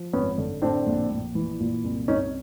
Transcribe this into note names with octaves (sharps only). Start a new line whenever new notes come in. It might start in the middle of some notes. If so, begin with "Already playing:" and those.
Already playing: F3
G#1 B3 C#4
D3
A2 C4 D4
A#1
A#1
E3
A#2
C2
C2 C#4 D#4